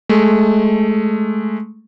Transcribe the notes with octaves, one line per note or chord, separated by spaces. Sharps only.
G#3 A3